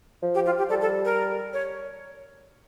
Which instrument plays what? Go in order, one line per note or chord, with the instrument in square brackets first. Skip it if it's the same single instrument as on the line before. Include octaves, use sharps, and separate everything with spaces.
[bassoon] F3
[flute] G4
F4
G4
[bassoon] G3 [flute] A4
[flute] A4
A#4
C#5